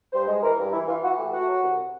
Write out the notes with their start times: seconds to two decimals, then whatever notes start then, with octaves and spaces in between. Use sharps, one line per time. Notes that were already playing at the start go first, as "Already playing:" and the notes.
0.13 G2 C5
0.28 G#3
0.43 E3 A#4
0.59 G2
0.73 E3 E4
0.88 E3 F4
1.03 E3 F#4
1.18 A3 G4
1.33 A3 F#4
1.48 F#3
1.63 C2